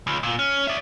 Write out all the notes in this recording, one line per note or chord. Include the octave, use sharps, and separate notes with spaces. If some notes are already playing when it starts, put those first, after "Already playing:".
C#2
A#2
C#4
D5 E5